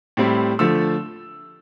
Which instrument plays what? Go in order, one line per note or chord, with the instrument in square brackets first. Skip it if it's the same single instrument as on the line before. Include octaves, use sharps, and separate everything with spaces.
[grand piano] A2 G3 C4 E4
D3 F3 A3 E6